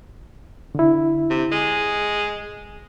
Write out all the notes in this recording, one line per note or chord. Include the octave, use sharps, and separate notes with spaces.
D3 E4
C3
G#3 G#4